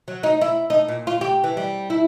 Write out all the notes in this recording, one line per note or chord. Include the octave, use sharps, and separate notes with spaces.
F#3
D#4
E4
D#4
A#2
F4
G4
E3
G3
E4